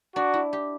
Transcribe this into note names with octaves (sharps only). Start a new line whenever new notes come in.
D4 F#4
E4
G4